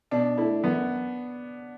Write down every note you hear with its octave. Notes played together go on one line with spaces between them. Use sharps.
B2 D4
A3 E4 A4
F#2 B3